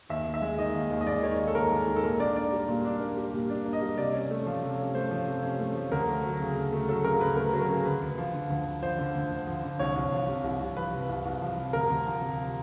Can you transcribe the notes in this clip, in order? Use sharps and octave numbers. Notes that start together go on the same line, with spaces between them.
D#2 E5
D#2
E5
G#3
D#3 D#5
D#2
D#2
D#5
G#3 D5
D#3 C#5
D#2
A4
D#2 A#4
G#3
D#3
A4
A#2 A#4
D4 D5
A#3 D5
G3
A#2
D4
A#3
G3
A#2
D4
A#3
D#5
G3
C3 D5
C#4
A3
F3
C3
C#4
A3 C5
F3
C3
C#4
A3
F3
D2 A#4
A3
F#3
C#3
D2
A3
F#3 A4
C#3 A#4
D2 B4
A3 A#4
F#3
A#4
C#3
D2 B4
D2
F3
D3
D2
D2
F3 C5
D3
D2
D2
F3
D3
C2 C#5
C2
F3
C3
C2
C2
F3 B4
C3
C2
C2
F3
C3
D2 A#4
D2
F3
C3